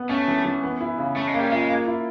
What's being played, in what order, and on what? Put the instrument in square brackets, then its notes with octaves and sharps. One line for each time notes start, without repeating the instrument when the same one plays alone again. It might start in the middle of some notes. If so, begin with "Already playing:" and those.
Already playing: [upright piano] B3
[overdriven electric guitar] A3 [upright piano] C#4
[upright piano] E3
E3
B3
E4
C#3
[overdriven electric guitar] A3 [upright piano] C#4
[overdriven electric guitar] G#3
[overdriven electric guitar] G3 [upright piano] A#3
[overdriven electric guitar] G#3 [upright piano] F4
[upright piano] A#3
E4